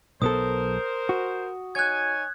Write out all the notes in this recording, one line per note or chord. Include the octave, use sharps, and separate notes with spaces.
B1 B3 A4 A#4 C5 D#6
F#4
D#4 C#5 G#5 F#6 G#6